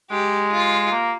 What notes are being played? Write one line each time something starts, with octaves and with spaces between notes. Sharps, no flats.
G#3 G4
F4
A#3